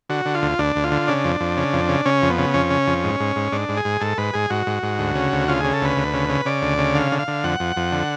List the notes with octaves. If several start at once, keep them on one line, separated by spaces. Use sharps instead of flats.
D3 F#4
D3
F4
D2
D2 D4
D2
F4
D3
C#3 D4
F2
F2
C#3
F2
C#3
C#3 C#4
F2
B3
C#3
F2 C#4
C#3
F2
G#2
G#2
G#2
G#2 D4
G#2
G#4
G#2
G#2 A4
G#2 B4
G#2 G#4
G#2 F#4
G#2
G#2
D2
C#3
D2
C#3 F4
C#3 G#4
A4
D2 B4
D2
C#3
C#3
C#3 D5
D2
C#3
D3 F5
D3
F5
D3
F2 F#5
F2
F2
D3